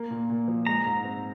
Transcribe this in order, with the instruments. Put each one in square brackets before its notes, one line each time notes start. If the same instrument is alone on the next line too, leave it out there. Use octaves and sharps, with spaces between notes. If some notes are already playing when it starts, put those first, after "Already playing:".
Already playing: [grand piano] A#3
A#2
A#2
F3
[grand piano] G#3 [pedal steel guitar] A#5
[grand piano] G#2
C4